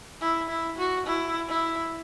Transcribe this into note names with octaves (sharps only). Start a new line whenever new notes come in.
E4
E4
F#4
E4
E4